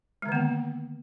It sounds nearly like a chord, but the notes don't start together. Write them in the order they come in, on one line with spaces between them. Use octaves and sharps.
G#3 D3 D#3 B3 A#3